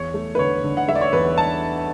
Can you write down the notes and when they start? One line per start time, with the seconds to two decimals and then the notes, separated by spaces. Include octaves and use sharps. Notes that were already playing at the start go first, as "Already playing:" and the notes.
Already playing: E2 C#5
0.14 A3
0.35 B4
0.39 D3 C#5
0.64 D3
0.77 F#5
0.88 A3 E5
0.95 D5
1.01 C#5
1.13 E2 B4
1.38 A5